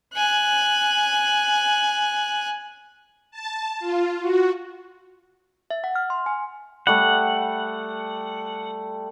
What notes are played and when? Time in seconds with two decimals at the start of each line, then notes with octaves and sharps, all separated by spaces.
0.14 G#5 F#6
3.31 A5
3.79 F4
4.21 F#4
5.70 E5
5.84 F#5
5.96 F6
6.10 C6
6.26 G#5
6.87 G3 A3 F#5